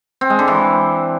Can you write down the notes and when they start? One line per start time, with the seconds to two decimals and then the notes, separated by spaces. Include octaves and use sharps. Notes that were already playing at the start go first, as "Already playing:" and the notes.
0.21 C4
0.30 G#3
0.39 D3
0.48 E3